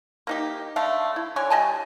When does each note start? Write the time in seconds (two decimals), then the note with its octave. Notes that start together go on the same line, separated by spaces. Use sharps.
0.27 A#3 D#4 G4
0.76 D3 A3 F5
1.16 E4
1.36 D3 C#5 G#5
1.50 G3 D#5 G#5 A5